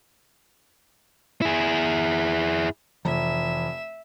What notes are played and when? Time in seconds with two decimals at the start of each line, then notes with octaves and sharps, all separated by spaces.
1.41 E4 G#4
3.05 F1 E3 E5